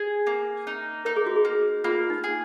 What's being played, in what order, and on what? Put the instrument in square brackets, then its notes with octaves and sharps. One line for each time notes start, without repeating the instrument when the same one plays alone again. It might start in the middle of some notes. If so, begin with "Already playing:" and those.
Already playing: [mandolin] G#4
A#3
D#4
[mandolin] D#4 [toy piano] A#4
[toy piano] G#4
F#4
G#4
[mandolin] A#3
[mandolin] A#3 [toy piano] F4
[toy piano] D#4
[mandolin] G#4